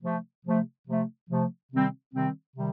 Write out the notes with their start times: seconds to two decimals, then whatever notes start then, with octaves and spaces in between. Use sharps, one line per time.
0.03 C3 F3 A3
0.46 C3 F3 A3
0.88 C3 F3 A3
1.29 C3 F3 A3
1.72 C3 D#3 G3 C4
2.14 C3 D#3 G3 C4
2.57 C3 D#3 G3